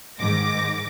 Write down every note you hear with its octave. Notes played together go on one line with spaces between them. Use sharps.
G#2 D#3 D6 A#6